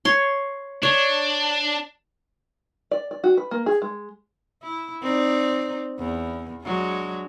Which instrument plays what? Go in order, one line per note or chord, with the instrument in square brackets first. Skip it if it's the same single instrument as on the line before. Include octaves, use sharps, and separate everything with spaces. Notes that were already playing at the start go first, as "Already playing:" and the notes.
[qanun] C#5 C6
[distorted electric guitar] D4 [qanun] C#5
[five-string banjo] D5
D5
F#4
B4
A#3
G#4
G#3
[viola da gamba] E4
C4 D#4 D5
E2
F#3 G#3 D4